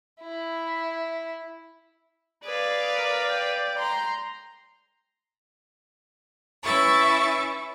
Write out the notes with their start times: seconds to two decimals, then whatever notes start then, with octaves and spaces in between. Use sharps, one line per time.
0.21 E4
2.45 G#4 B4 D5 F5
2.97 A#4
3.30 G5
3.79 A#5 C6
6.63 C#4 E4 B4 E5 C#6 A6